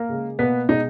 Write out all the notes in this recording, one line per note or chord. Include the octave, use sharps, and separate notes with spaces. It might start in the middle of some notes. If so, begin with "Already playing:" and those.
Already playing: A#3 A#4
C#3 G#3
B2 A#3 B3 B4
B2 G#3 D#4 D#5